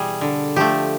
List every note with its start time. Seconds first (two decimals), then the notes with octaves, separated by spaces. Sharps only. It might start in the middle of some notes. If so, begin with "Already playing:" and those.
Already playing: B2 E3 G3 G#4
0.21 D3
0.56 F3 A3 G4